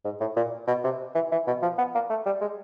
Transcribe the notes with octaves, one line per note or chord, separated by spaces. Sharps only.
G#2
A2
A#2
B2
C3
E3
E3
B2
F3
B3
A#3
A3
G3
G#3